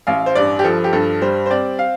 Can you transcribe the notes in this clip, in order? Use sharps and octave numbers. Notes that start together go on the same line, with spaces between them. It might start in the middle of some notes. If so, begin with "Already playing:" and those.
A1 F5
C5
G2 D5
G4
F3 A4
G4
G2 A4
G3 C5
C5
C4 D5
F5